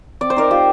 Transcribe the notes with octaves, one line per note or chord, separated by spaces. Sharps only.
C4 D5
C5
D#4 A#4 D5
F4 G4